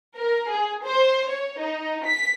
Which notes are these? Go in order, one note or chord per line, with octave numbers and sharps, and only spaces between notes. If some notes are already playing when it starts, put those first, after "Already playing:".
A#4
G#4
C5
C#5
D#4
B6